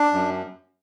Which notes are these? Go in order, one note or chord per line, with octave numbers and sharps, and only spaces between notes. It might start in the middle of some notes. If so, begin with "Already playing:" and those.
Already playing: D4
F#2